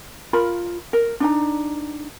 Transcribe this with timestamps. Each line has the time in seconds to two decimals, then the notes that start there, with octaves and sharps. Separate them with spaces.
0.33 F4 A#4 B5
0.93 A#4
1.20 D4 D#4 A#5